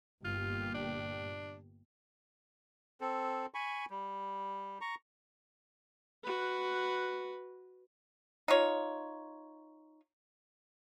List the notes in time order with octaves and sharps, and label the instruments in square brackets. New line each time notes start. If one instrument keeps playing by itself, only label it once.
[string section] G1 A#2 G4 [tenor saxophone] F4
[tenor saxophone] D4
[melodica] C4 A4
G#5 B5 C#6
G3
A#5 C#6
[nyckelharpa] F#4 B4
[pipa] D#4 F4 C#5